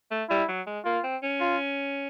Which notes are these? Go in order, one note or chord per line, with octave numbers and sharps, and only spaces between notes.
A3
G3 E4
F#3
G#3
A#3 F4
C4
C#4
F4